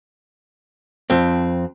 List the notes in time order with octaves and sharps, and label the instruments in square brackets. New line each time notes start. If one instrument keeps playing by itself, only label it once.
[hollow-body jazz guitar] F2 C4